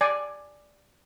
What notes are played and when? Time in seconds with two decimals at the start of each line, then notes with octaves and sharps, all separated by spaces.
0.01 D5 G#5